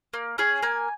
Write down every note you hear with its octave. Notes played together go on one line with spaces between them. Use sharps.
A#3
C#4 G#4
A#3 G#5